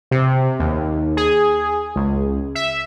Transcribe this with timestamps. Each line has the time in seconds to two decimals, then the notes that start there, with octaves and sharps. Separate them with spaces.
0.11 C3
0.60 D#2
1.17 G#4
1.96 C#2
2.55 E5